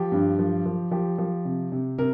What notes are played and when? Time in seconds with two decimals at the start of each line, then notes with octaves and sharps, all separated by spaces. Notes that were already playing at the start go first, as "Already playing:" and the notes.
Already playing: F3 G4
0.12 G2
0.39 F3
0.66 F3
0.91 F3 G4
1.18 F3
1.45 C3
1.72 C3
1.98 C3 A#4